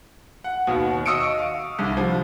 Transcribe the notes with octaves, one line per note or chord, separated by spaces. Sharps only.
F#5
D#2 B2
D#5 C#6 D#6 E6 C#7 D7
F5
C2 D3
F3 G3